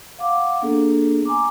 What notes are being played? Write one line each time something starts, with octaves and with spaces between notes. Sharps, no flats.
F5 F#5 D6
A#3 B3 D4 G#4 A4
G#5 A#5 D6